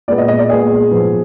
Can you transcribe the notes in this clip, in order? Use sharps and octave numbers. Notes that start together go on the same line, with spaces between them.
A#2 G#3 B3 D5
D#5
D#5
D5
A#2 G#3 B3 G#4
G#2 F3 G#3 B3